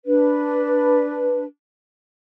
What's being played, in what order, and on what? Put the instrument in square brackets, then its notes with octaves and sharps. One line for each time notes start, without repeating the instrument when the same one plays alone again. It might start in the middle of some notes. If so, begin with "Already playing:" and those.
[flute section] D4 B4